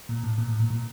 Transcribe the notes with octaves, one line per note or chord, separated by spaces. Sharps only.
A#2
A2
A#2
A2
A#2
A#2